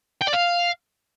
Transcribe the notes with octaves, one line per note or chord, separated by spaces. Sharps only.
G5
D5
F5